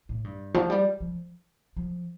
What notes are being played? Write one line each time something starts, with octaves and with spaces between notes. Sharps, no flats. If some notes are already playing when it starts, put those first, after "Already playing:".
A2
G2
F3
G3
F3
F3